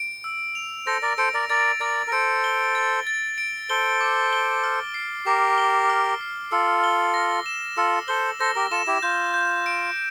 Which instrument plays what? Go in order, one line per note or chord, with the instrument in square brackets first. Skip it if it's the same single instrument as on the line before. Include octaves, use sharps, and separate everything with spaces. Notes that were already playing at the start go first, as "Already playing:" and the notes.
Already playing: [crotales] D7
E6
F7
[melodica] A4 C5 [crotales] A#6
[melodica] A#4 D5
[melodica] A4 C5 [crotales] D7
[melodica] A#4 D5
[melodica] A#4 D5 [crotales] A6
[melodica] A#4 D5 [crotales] A6
[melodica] A#4
[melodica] A4 C5 [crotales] D7
[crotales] G7
A6
A6
D7
[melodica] A4 C5 [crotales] G7
[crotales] D6
G7
F6
C7
[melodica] G4 A#4 [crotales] D6
[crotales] G7
F6
C7
[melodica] F4 A4 [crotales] E6
[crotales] G7
A#6
E7
[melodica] F4 A4 [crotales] E6
[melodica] A4 C5 [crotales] G7
[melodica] A4 C5 [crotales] A#6
[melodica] G4 A#4
[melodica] F4 A4 [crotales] E7
[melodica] E4 G4
[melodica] F4 [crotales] G6
[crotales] G6
D7